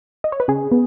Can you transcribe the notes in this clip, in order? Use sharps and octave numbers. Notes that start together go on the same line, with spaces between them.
D#5
C#5
B4
C#3 G#4
B3